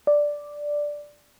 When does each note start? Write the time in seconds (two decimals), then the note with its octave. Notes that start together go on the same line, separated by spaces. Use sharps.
0.07 D5